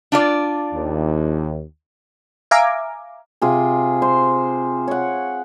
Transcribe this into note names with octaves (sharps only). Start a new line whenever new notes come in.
D4 F4 D5
D#2
E5 F5 G#5 A#5 D6
C3 F4 G#4
C5 C6
C#5 F#5